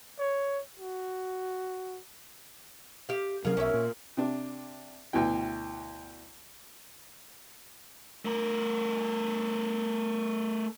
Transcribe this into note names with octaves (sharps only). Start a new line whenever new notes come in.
C#5
F#4
G4 F5
C3 F#3 C#4 F4 G#4 A#4
B1 C#4 E5
A#2
C3 D4
D2 B2 E3 G5
A3 A#4